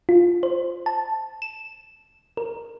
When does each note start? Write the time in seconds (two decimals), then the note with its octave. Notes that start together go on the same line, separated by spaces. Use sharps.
0.09 F4
0.43 C5
0.86 A5
1.42 E7
2.37 A#4